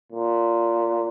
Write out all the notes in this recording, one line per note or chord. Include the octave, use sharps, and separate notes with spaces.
A#2